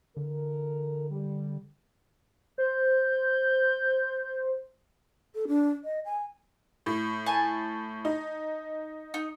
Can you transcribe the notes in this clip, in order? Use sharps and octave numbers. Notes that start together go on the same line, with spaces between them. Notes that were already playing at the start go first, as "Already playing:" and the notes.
D3 E3 A4 A#4
G3
C5 G6
A4
D4
D#5
G#5
A2
G#5 A5
D#4
D#4